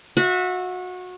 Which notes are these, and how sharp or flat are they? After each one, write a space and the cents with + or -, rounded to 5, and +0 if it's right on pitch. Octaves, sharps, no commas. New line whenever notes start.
F#4 -25 E5 +0